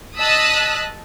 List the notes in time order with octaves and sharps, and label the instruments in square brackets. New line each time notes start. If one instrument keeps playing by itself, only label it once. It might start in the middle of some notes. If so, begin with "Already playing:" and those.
[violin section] D#5 A5 D#6 E6 F#6 B6